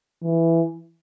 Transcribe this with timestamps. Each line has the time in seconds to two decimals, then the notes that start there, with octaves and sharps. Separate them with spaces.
0.23 E3